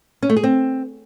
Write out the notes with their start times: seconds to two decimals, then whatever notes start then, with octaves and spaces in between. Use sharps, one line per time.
0.22 C#4
0.30 A3
0.37 G#4
0.44 C4